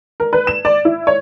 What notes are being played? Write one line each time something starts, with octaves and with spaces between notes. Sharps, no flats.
A#4
B4
E7
D5
E4
C#5